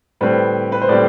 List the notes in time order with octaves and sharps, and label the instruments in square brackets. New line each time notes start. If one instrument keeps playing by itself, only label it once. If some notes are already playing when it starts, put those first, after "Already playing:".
[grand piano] A2 G3 C4 B4
B4
C5
A2 G3 C4 D5